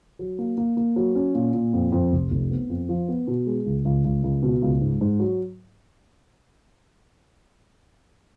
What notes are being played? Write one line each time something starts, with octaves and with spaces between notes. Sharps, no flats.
F#3
A#3
A#3
A#3
F#3
C#4
A#2
A#2
F2
F2
F1
F1
B3
F2
F3
B3
B2
G#3
C#2
C#2
C#2
C#2
B2
C#2
G#2
G#2
F#3